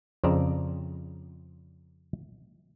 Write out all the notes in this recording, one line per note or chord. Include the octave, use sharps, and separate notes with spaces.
F2 C#3 C5 D5 A#5